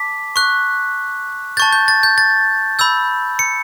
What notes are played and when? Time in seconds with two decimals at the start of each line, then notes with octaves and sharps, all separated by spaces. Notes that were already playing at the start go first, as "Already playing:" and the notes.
Already playing: A5 D6 B6
0.36 C#6 F#6
1.57 A5 C#6 G6 A6
1.73 G6
1.88 A6
2.03 G6
2.18 A6
2.79 B5 E6 G6
3.39 C#7